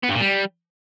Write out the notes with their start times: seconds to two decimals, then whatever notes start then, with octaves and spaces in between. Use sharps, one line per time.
0.04 B3
0.09 G2
0.15 A#2
0.21 G3